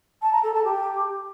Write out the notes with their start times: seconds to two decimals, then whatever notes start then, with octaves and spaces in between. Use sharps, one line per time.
0.22 A5
0.33 A#5
0.43 A4
0.54 A5
0.64 G4